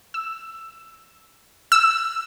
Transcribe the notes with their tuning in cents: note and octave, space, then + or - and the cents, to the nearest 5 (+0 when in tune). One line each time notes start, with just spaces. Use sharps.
E6 +5
E6 +5